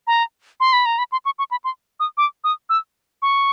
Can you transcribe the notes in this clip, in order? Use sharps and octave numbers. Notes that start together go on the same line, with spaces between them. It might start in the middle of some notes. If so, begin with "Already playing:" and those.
A#5
C6
B5
A#5
B5
C6
C#6
C#6
B5
C6
D#6
D6
D#6
E6
C#6